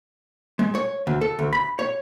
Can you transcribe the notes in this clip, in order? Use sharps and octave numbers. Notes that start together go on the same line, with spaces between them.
G#3
C#5
D2
A4
D2
B5
C#5